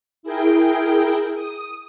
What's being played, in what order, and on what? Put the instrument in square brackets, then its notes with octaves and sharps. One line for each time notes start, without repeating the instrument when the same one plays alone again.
[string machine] E4 G#4 A#4 G5
D#6